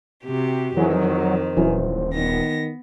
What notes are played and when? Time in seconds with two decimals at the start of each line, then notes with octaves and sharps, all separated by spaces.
0.23 C3 F#4 G4
0.77 F2 D#3 E3 F#3 G#4 C5
1.57 D#1 E3 F#3 C#4
2.13 D#3 B3 A#6